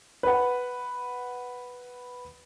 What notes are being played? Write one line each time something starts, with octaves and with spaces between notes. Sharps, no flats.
B4 F#5